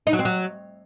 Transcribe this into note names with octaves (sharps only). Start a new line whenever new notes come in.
D#4
F#3
C4
F#3